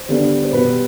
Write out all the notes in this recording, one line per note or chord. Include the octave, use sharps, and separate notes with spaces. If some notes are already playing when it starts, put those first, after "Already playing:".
Already playing: C5
D3 G3 B3 D4
C5
B2 G3 B3 B4